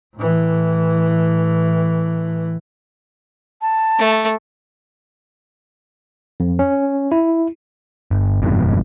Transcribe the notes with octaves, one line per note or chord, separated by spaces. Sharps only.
A2 E3
A5
A3
F2
C#4
E4
G1
G1 F2 G#2 B2